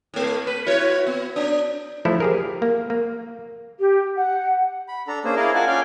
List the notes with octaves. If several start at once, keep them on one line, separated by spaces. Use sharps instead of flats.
A2 A3
B4
E4 F#4 C#5
B3
D4
E3 F3 A3 E4 A4
G4 G#4 A#4
A#3
A#3
G4
F#5
B5
D4 A4 A#5
A#3 C#4 D4 G#4 C5
E4 G#4 A#4 D5 D#5 F5
F4 A#4 F#5 G#5 A5
C#4 F4 D5 F5 G5 G#5